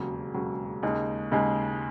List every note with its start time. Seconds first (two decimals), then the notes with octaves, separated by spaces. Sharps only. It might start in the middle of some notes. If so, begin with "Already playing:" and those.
Already playing: E1 D#2 C#3 F#3
0.34 E1 D#2 C#3 F#3
0.83 D#2 C#3 G#3 D#4 G#4
1.32 D#2 C#3 G#3 D#4 G#4